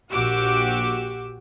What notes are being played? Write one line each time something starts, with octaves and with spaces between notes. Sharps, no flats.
A#1 F#4 G4 D6 E6